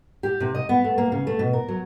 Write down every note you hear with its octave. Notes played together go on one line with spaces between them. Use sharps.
G4
C3
D#5
B3
A3
A#3
C#3
A3
B2
A#4
F#3